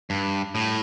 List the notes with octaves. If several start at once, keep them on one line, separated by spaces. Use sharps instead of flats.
G2
A2